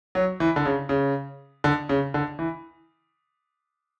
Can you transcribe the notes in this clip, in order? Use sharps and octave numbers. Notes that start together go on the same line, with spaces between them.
F#3
E3
D3
C#3
C#3
D3
C#3
D3
E3